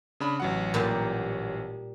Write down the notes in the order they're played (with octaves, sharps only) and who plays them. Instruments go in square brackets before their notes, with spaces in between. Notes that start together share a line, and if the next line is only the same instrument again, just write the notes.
[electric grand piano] C#3 D4 B5
A1 F#3 F#5
[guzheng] A#2 G3